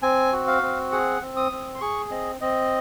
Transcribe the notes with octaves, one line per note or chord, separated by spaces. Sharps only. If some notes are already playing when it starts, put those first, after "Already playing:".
C4 G#5
F#4
F5
C4
G#4 F#5
C4
D#6
C4
C6
G#4 C#6
C4 D#5
C4 D#5